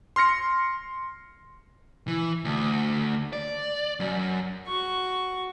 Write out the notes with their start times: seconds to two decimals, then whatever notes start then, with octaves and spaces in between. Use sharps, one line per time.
0.16 C6 F6 A#6 C#7
2.08 E3
2.45 D2
3.33 D5
4.00 F#2
4.67 F#4 C#6